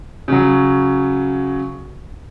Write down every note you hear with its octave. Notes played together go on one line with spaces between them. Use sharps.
C#3 F#3